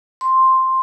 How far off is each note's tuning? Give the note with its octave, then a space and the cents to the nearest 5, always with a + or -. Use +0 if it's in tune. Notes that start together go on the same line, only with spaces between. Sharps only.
C6 +5